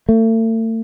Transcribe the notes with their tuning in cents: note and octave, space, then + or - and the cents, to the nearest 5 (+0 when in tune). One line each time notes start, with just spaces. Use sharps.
A3 +40